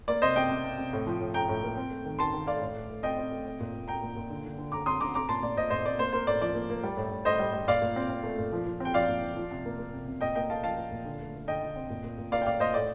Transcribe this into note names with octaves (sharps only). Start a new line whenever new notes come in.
A#3 D5
C3 C5 D#5
C3 D#5 G5
C3
C3
C3
A2
F3
A2
A2 G5 A#5
A2
A#3
C4
A3
D#3
D#3 A5 C6
D#3
A3 D5 F5
A2
A3
A3
C4 D#5 G5
C4
A3
C4
A#2
A#2
C4 G5 A#5
A#2
A#2
D3
D3
D3
D3 A#5 D6
C4 C6 D#6
D3 A#5 D6
C4 A#5 D6
A#2 A5 C6
A#2 D5
A#2 C5 D#5
A#2 C5 D#5
C4 D5
A#3 C5
A#3 C5
A2 D5
F3 D5
A#3
A#3
G3
A2
A2
A2 C5 D#5
G3
G3
A#2 D5 F5
A#2
C4
C4
A3
A#2
F3
F3
C4 G5
F3 D5 F5
A#2
F3
F3
C3
A#3
A#3
C3
C3
A#2 D#5 G5
A#3 D#5 G5
A#3 F5 A5
F3 F5 A5
A#3
A#2
D3
A3
A3
D3 D#5 G5
D3
C4
A#2
A#2
A#2
A#3 D5 F5
G5
A#2 D5 F5
A#2 C5 D#5
A2 D5